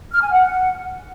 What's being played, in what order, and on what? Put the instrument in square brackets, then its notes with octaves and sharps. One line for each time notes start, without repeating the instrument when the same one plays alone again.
[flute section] F6
G#5
F#5